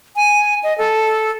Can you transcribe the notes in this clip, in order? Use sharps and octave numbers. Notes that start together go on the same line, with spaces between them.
G#5
D#5
A4